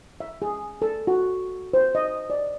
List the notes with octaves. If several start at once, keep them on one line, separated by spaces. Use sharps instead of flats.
E5
G#4
A4
F#4
C5
D#5
D5